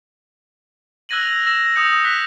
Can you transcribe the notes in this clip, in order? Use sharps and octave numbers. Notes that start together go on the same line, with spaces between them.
E6 F#6 G#6 A#6 D#7 F#7
F7
E6 A#6 E7
D#6 E6 G6 C#7
F#6 B6